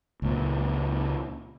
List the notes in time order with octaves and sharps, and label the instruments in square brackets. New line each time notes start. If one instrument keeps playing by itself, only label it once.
[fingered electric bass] C#2 A#2